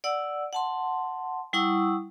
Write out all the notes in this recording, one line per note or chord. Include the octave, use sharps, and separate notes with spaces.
D5 F#5 E6
F#5 A5 C6
G3 E4 F#5 C#6 D#6 E6